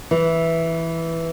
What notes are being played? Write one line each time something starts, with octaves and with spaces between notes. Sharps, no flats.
E3